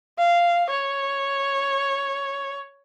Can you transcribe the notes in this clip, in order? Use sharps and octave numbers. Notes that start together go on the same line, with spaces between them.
F5
C#5